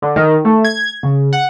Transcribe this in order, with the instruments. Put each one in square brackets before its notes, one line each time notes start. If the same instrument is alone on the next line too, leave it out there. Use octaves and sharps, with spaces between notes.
[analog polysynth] D3
D#3
A3
G#6
C#3
F#5